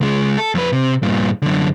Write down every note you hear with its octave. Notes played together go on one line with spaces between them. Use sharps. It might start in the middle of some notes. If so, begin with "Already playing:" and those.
C#2 G#3
A4
F2 B4
C3
G2 A#2
F#2 D3